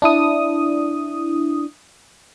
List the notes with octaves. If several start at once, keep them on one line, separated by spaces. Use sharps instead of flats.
D4 E4 D#6